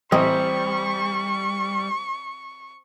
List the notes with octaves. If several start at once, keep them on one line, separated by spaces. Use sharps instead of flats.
A1 G3 C4 D#5 C#6